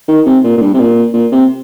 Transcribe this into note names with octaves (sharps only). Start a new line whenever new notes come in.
D#3
C3
A#2
A#2
G2
C3
A#2
A#2
C3